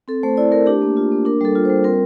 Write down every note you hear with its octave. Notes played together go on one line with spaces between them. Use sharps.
C4 A4
A3 C5
E4 D5
A3 A#4
D4 G4
A#3
F4
A#3
D4 A#4
G3 A4
F4
C5
G3
C4 A#4